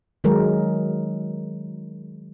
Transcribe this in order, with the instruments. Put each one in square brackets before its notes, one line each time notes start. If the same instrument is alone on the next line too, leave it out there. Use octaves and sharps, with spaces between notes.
[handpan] D#3 F#3 G#3 A#4